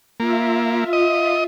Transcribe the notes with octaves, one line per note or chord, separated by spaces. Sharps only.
A#3 F4 E5
D#5